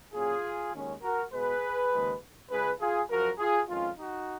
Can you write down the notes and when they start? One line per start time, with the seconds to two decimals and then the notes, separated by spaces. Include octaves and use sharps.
0.13 A#2 F#3 C#4 F4 G#4
0.73 D#2 D#3 G#3 C#4
1.02 F#4 A#4
1.31 B2 G#3 B3 G#4 B4
1.92 D#2 C#3 F3 G#3
2.50 C#2 C#3 G#3 G#4 B4
2.80 F4 G#4
3.09 F#2 C#3 F3 F#4 A#4
3.38 F4 G#4
3.68 F2 D#3 G#3 C#4 F4
3.98 D#4 F#4